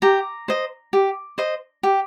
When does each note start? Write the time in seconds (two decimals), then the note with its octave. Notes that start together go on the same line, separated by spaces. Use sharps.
0.02 G4 A#5
0.48 C5 D#5
0.93 G4
1.38 C5 D#5
1.83 G4